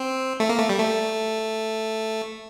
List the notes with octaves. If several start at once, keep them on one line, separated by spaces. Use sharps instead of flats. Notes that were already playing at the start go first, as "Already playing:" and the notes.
Already playing: C4
A3
A#3
A3
G3
A3